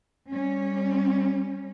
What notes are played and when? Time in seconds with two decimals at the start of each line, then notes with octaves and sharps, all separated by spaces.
0.29 G3 C#4